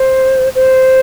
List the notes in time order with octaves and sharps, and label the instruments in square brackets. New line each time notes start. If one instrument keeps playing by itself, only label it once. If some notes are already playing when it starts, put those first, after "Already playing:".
Already playing: [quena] C5
C5